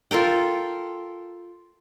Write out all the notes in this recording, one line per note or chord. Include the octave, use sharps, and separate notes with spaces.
F4 A4 A#4 G5